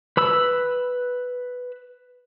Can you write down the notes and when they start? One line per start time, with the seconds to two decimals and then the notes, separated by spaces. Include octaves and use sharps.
0.17 B4 B5 E6